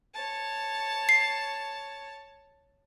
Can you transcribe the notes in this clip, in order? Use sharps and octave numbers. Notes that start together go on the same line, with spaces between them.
C#5 A5
C7